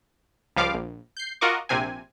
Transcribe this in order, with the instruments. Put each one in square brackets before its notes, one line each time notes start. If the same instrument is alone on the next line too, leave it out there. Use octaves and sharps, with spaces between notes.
[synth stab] C#2 F3 G3 F5 D6
A#1
G6 C7
F4 F#4 A#4 D#5 C#6 D6
A#1 C3 C4 G#5